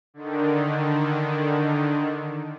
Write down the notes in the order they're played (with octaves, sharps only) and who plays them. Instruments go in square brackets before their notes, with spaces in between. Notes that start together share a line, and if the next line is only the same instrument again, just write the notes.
[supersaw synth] D3 D#3